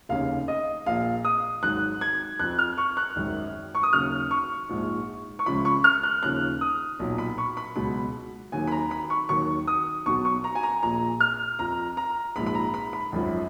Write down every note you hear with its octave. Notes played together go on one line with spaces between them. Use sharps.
F1 D#2 C#3 F5
D#5
A#1 A#2 F3 F5
D#6
G#1 G#2 F#3 F#6
G#6
F2 F3 F#6
F6
C#6
F#6
G#1 F#2 D#3 F#3
C#6
D#6
D#2 C#3 F#3 F6
C#6
A#1 G#2 F3
C#6
C#2 C#3 F3 B5
C#6
F6
F#6
D#2 C#3 F3 F#6
D#6
B1 A#2 F#3
B5
C#6
B5
C#2 B2 F#3 B5
D#2 D#3 F#3 G#5
B5
A#5
B5
C#6
D#2 D#3 F#3 C#6
D#6
B1 B2 F#3 C#6
C#6
A#5
G#5
A#5
A#1 A#2 F3 A#5
F6
F2 F3 A#5
A#5
A#1 G#2 F3 B5
B5
A#5
B5
B5
G#1 F#2 F3